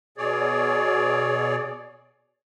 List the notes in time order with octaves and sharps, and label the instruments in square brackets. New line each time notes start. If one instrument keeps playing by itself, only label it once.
[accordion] B2 G#4 C#5 D5